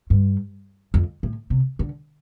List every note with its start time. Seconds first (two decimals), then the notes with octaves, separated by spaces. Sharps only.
0.10 G2
0.94 F2
1.23 A2
1.50 C3
1.79 D3